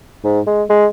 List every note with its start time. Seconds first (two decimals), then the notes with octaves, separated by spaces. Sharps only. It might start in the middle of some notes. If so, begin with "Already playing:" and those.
0.24 G#2
0.47 G#3
0.70 G#3